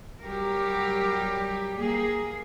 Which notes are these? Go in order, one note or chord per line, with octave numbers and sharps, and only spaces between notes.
F#3 G3 G4 A#4
A#3 G#4